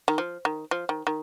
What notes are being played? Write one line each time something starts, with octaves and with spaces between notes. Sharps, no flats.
D#3
F3
D#3
F3
D#3
D#3